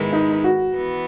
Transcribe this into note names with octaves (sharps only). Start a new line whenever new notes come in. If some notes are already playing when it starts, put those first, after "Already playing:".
Already playing: G#2 D#3 G#3 B3 E4
D#4
F#4
E3 B3